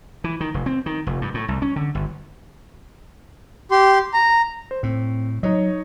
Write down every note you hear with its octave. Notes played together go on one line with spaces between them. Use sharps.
E3
D#3
F1
C4
D#3
F1
G2
A2
C2
C#4
D3
G1
G4 C6
A#5
C5
A2 C4
F#3 D#4 C#5 D#5